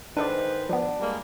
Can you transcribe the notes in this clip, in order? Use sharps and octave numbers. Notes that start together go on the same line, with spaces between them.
G#2 D#3 D4 A4 B4 C5 D5
F3 B3 D4
G3 G#3 A#3